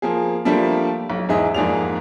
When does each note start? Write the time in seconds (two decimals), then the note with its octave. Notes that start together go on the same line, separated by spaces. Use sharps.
0.02 F3 A#3 G#4
0.45 F3 G3 A3 A#3 D4
1.10 B1
1.29 E2 G#2 G#4 D#5 E5
1.54 F2 G#2 A#3 G#4 D5 F7